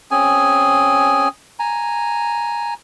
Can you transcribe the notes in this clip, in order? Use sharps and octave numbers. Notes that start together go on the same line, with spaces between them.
C4 C#4 G#4 G#5
G#5 A#5